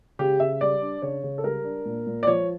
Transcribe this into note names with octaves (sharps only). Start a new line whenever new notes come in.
C#3 G4
C#3 E5
G3 D5
D4
C#3 C#5
C#3
A4
G3 A#4
D4
A#2
A#2
D5
F3 C#5